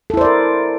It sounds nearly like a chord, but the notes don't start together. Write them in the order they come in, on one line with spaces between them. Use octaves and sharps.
A4 E4 C5 D5 A#4